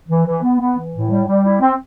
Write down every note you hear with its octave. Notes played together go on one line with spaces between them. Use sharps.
E3
E3
B3
B3
E3
A2
G3
G3
E4
C4